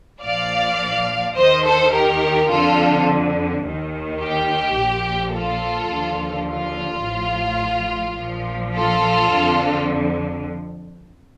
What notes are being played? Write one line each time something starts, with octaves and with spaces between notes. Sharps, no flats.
A#1 A#2 F3 D5 F5
D#2 D#3 C5 D#5
A4 C5
G4 A#4
F2 D3 F3 F4 A4
D#2 D#3
G4
A#1 A#2 F3
F4 A4
D#2 D3 F3
F4
A1 A2 F3
A#1 A#2 F3
F4 A4
F2 D3 F3